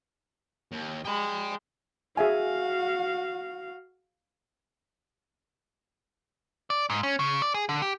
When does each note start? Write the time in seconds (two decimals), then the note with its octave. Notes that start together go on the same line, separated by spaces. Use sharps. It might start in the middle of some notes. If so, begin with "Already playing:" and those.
0.72 D#2
1.05 G#3 G5 B5
2.17 F#4 G#4 E5 F5 G#5
6.70 D5
6.90 G#2
7.03 C#4
7.19 C#3
7.42 D5
7.54 G#4
7.69 D3
7.82 G4